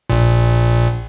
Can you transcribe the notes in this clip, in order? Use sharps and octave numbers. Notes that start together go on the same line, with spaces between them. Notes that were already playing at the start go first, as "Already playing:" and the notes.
A#1 A#2